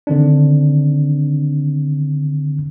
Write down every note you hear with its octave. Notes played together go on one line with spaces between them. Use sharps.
D3 D#3 C4 D4